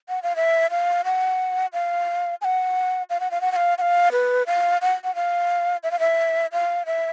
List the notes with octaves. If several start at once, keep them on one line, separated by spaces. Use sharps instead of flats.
F#5
F5
E5
F5
F#5
F5
G#5
F#5
F5
F#5
F5
F#5
F#5
F5
F#5
F5
B4
F5
F#5
F#5
F5
E5
F5
E5
F5
E5